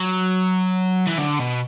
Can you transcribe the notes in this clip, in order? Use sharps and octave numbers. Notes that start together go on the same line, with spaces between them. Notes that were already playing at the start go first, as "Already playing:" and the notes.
Already playing: F#3
E3
D3
B2